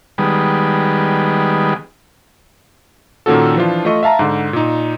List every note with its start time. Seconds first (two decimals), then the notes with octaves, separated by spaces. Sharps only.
0.18 D#3 G3 G#3 B3
3.26 A#2 D#3 A#3 C#4 F#4 A4
3.56 E3 F3 D4 F4
3.85 A3 F4 D#5 C#6
4.03 E5 F5 A5 A#5
4.19 G#2 D3
4.53 A#2 D#4